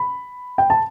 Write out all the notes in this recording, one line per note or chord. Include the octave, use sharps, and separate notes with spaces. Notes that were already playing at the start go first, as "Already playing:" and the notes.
Already playing: B5
G5
A5